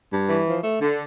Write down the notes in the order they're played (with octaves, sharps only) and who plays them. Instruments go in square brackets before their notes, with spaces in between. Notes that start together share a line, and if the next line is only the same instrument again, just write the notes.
[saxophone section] G2
E3
F3
A3
D3